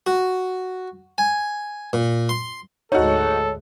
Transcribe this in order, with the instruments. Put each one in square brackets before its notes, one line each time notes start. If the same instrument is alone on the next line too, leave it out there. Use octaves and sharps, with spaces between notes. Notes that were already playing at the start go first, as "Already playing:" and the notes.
[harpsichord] F#4
G#5
A#2
C6
[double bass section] D2 G#2 G#3 [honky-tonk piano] D#4 F#4 [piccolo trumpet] A4 [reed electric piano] C#5